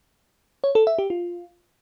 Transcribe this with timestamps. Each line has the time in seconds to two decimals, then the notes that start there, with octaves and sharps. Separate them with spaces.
0.64 C#5
0.75 A4
0.87 E5
0.99 G4
1.10 F4